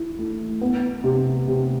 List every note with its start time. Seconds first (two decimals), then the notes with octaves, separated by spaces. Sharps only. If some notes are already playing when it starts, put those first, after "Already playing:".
Already playing: E4
0.19 A3
0.61 B3
1.04 C3
1.47 C3